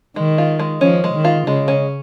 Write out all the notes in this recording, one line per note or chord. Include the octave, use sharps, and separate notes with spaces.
D#3 G#3
F4
G#3
F3 C#4
G#3
D#3
F4
C#3 G#3
C#4